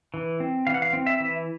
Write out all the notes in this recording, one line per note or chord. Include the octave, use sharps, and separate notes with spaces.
E3
C4
E3 F5
F#5
F5
C4
E5
E3